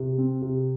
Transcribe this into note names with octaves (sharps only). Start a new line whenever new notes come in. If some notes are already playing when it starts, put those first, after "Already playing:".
Already playing: C3
C4
C3